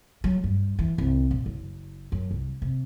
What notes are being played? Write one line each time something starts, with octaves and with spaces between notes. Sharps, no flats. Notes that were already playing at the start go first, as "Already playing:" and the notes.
F#3
G2
E3
C2
A#1
F#1
F#2
C2
C3